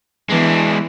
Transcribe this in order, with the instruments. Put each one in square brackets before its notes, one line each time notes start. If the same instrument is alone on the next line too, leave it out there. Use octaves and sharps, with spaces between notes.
[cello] E3 B3 [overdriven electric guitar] G#3 D4